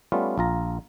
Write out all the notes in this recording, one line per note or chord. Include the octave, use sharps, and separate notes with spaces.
G3 A3 B3 C#4 F4
A#1 F4 A#5